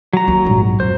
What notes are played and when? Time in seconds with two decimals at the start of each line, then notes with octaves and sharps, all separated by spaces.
0.13 F#3 A#5
0.28 D#2
0.45 A#1 G#2
0.80 F2 C5